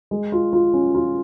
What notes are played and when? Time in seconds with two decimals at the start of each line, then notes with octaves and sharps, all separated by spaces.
0.11 G#3
0.32 F4
0.53 F4
0.74 C#4
0.95 F4